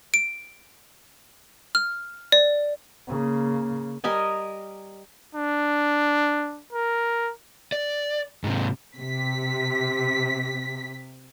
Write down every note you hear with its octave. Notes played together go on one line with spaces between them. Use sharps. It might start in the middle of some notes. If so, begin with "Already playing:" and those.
D7
F6
D5
C#3 A#3
G3 A#4 D#5 G#5
D4
A#4
D5
G#2 C3
C3 B6